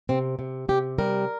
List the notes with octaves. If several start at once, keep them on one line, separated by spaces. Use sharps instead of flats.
C3 C4
C3
C3 G4
G3 A#4